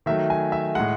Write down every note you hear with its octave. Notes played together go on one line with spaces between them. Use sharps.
D#3 F#3 A3 E5
G#5
E5
A2 G#3 F#5